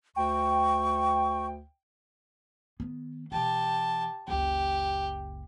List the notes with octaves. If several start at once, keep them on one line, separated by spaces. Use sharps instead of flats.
D2 G5 C#6
D#3 B3
B2 E3 G4 A5
F#1 C#2 G4